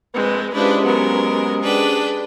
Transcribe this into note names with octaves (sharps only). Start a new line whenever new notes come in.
A#1 G#3 C4 B4
G#3 C#4 D4 E4 F4 G4 B4 C5
F#3 B3 A#4
D4 G#4 B4 G5